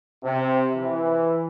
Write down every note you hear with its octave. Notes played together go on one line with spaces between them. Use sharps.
C3
E3